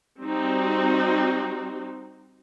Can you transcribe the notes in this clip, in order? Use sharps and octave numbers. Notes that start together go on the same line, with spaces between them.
G3 C4 D#4 F#4